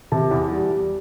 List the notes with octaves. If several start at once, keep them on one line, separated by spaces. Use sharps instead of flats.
C3 A5
E2
G3
G3